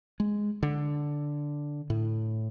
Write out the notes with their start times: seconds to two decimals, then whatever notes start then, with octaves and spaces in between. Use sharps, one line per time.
0.20 G#3
0.63 D3
1.90 A2